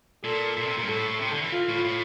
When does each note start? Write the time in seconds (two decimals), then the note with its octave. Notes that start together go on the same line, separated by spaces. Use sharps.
0.24 A#2 A4
0.57 A#2
0.67 C3
0.77 A#2
0.83 G2
0.88 A2 A4
1.20 C3
1.31 D3
1.42 E3
1.53 F4
1.69 A2
1.84 A2